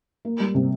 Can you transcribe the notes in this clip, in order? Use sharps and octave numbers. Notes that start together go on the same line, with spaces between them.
A#3
G3
C3